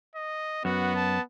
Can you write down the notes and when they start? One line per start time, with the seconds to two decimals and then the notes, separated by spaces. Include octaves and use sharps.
0.15 D#5
0.65 F#2 B3 F#4
0.96 A5